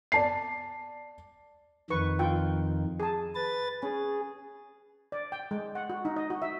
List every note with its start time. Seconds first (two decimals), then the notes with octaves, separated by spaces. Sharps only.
0.12 D5 A5 C7
1.90 F2 D#3 B4 C#6
2.19 F4 G5
3.00 G#4 A5
3.35 B4 A6
3.83 C#4 G#4
5.12 D5
5.32 G5
5.51 G#3
5.75 F#5
5.90 F#4
6.05 D#4
6.16 D#5
6.30 F#4
6.42 E5